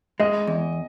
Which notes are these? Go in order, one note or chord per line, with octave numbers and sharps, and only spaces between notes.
G#3 D#5
E2